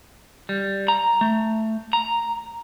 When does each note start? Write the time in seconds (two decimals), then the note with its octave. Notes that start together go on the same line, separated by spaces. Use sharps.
0.49 G3
0.88 A#5
1.21 A3
1.93 A#5